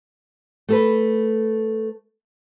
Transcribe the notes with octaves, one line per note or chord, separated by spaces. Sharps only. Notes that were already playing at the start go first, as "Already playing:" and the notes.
A3 A4 B4